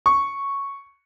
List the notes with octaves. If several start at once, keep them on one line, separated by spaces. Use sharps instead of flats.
C#6